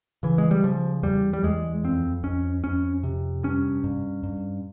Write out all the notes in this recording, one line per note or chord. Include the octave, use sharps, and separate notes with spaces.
C#3 E3
G#3
G3
C#3 F3
E2 G3
G3
E2 G#3
F2 C4
F2 C#4
F2 C#4
C3
G2 C#4
G2
G2